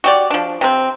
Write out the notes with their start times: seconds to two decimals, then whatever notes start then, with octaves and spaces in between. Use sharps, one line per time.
0.04 F#4 G4 D5
0.30 F3 D4
0.61 C3 C4